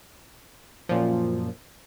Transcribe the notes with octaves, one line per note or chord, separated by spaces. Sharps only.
F#2 A#2 F3